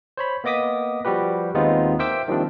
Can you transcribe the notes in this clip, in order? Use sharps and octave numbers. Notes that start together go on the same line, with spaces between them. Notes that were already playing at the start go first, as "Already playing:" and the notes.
C5 C#5 B5
A#3 B3 D#5 D6 D#6 B6
F3 G3 F#4 G4 B4
D#2 G#3 B3 C4 D#4 F4
A#4 C5 E5 G5 D6 E6
D#3 F3 G3 A#3 C4 D4